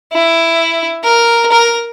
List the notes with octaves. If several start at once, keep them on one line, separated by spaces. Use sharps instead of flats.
E4
A#4
A#4